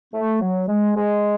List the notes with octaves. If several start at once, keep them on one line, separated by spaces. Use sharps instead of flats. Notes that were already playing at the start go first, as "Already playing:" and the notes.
A3
F#3
G#3
G#3